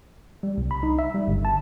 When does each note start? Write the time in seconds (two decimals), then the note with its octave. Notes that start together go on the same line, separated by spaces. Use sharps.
0.43 G3
0.58 C2
0.71 B5
0.83 D#4
0.99 E5
1.15 G3
1.27 G1
1.45 A5